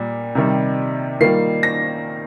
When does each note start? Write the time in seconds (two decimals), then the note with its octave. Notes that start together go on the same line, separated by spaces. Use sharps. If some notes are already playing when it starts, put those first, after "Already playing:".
Already playing: A#2 G3
0.35 C3 D#3 G3
1.20 D#3 G3 A#3 F4 C7
1.63 A#6